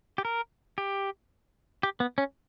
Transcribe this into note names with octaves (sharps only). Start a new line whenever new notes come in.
G4
A#4
G4
G4
B3
C#4